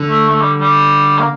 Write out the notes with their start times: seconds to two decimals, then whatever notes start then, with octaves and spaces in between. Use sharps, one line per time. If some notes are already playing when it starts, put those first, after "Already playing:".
Already playing: D3
0.10 A3
0.29 A3
0.40 G3
0.60 G3
1.19 A#3